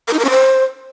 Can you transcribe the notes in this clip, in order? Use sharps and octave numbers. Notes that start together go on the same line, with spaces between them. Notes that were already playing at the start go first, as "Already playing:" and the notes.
A#4
D#4
A#4
C#4
C5